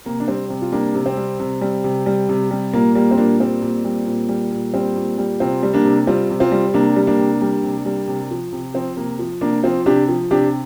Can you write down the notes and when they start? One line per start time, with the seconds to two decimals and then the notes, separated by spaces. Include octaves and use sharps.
0.05 C3 A#3
0.20 D4
0.28 G3 C4
0.50 C3
0.62 F4
0.72 G3 A#3 D4
0.95 C3
1.06 C4
1.17 G3
1.40 C3
1.61 G3
1.84 C3
2.06 G3
2.29 C3
2.51 G3
2.73 A#2 A#3
2.95 G3 A#3
3.11 C4
3.18 A#2 A#3 D4
3.40 G3 C4
3.62 A#2
3.84 G3
4.06 A#2
4.29 G3
4.51 A#2
4.74 G3 C4
4.96 A#2
5.18 G3
5.40 C3 C4 F4
5.63 G3
5.74 A#3 D4
5.85 C3
6.07 G3 C4 F4
6.30 C3
6.40 C4 F4
6.52 G3
6.74 C3 A#3 D4
6.96 G3
7.07 A#3 D4
7.19 C3
7.41 G3
7.63 C3
7.85 G3
8.08 C3
8.31 F3
8.52 C3
8.74 F3 C4
8.97 C3 A#3
9.19 F3
9.41 C3 A#3 D4
9.63 F3 C4 F4
9.86 C3 D4 G4
10.08 F3
10.31 C3 D4 G4